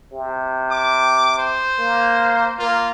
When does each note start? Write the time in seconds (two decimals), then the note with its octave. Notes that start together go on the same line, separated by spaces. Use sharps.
0.12 C3
0.71 D6
1.39 C5
1.79 A#3
2.59 A#3 F4